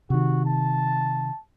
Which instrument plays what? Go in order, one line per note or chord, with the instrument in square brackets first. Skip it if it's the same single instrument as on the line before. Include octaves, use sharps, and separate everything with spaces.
[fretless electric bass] C3 D#3 [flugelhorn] F#4
[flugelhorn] A5